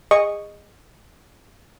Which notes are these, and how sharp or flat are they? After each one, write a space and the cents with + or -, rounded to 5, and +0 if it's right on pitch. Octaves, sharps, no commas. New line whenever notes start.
G#4 -25 D#5 -10 C#6 +0